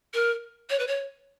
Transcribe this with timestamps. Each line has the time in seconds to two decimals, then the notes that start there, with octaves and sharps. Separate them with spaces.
0.14 A#4
0.69 C#5
0.79 B4
0.87 C#5